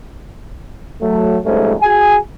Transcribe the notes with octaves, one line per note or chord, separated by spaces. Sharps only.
F#3 A3
F2 G#2 G3 A3 C#4
F#4 G#4 G#5